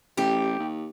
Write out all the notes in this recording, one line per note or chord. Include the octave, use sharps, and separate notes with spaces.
A1 G4
D#2